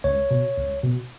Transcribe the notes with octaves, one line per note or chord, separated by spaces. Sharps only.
C#2 C#5
B2
C#2
B2